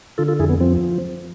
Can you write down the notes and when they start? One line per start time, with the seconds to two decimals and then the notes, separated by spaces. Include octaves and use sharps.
0.18 D3 F4 A4
0.28 F4 A4
0.39 F2 E4 G#4
0.49 B3
0.60 F3 C4